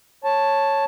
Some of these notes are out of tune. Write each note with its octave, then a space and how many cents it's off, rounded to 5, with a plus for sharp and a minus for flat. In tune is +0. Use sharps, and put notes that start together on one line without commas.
C#5 -5 A5 +0